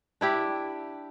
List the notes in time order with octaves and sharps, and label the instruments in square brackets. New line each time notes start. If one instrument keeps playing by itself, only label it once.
[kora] D4 E4 G4